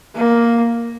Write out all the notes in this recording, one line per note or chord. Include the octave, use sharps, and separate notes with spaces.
A#3